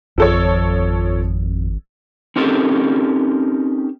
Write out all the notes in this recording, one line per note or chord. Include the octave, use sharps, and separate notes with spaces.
G#1 F2 F3 A4 C#5
C4 C#4 D#4 G4 A4 A#4